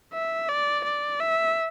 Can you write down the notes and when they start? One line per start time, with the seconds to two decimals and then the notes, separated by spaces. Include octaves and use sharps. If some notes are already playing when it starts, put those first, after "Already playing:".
0.14 E5
0.49 D5
0.85 D5
1.20 E5